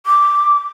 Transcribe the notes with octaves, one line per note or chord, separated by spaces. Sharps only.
D6